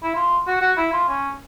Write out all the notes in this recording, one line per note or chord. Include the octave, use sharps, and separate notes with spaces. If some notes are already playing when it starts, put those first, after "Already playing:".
E4
F4
F#4
F#4
E4
F4
C#4